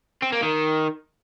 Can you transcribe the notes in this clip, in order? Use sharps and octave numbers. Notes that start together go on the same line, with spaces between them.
C4
A#3
D#3